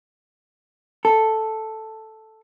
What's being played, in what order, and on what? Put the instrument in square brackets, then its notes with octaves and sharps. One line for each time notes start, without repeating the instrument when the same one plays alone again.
[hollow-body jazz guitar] A4